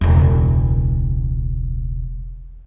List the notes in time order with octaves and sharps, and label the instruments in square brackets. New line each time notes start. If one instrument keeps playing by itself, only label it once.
[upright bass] E1 C#2